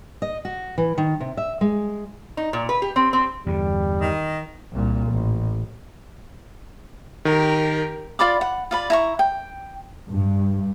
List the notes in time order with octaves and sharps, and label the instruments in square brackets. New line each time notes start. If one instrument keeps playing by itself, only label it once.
[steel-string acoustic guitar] D#5
F#4
E3
D#3
C3
E5
G#3
[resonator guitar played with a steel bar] D#4
A#2
B4
G4
C4
C4
[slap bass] E2 G2 D3 [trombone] G3
[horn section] D#3 D#5
[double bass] C2 A#2
A1
[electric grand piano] D#3 [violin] G4 A#4
[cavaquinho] F4 D5 B5 D6
F#5
F4 D5 B5
E4 A#5 C#6
G5
[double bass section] G2